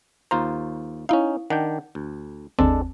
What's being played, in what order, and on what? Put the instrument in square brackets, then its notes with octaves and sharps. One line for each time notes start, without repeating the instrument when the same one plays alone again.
[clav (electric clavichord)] D#2 F4 C5 [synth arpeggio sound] A#5
[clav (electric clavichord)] C#4 D#4 [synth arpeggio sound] E4 F5
[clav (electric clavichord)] D#3 D4 G5 [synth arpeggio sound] F#5
[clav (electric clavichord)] D2
[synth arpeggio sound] G1 D#2 C4 [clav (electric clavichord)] G#3 D4 A4